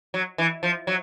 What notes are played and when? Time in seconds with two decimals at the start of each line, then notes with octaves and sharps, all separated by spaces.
0.14 F#3
0.38 E3
0.63 F3
0.87 F#3